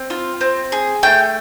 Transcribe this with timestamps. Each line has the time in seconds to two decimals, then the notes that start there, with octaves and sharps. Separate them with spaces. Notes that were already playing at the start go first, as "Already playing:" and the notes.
Already playing: C4
0.10 F4
0.41 C4
0.72 G#4
1.03 A3 G5